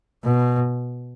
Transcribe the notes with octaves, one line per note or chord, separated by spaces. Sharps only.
B2